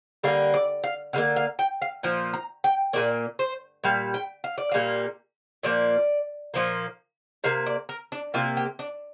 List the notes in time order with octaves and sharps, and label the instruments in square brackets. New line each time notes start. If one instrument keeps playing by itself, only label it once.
[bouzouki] D3 G3 A#3 F5
D5
F5
D3 G3 A#3 F5
F5
G5
F5
A#2 F3
A#5
G5
A#2 F3 A#3 D5
C5
A#2 G3 F5
G5
F5
D5
A#2 G3 A#3 F5
A#2 F3 A#3 D5
A#2 F3 A#3
C3 A#3 F5
D5
A#4
D4
C3 A#3 F4
G4
D4